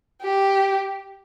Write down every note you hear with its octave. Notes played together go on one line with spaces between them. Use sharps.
G4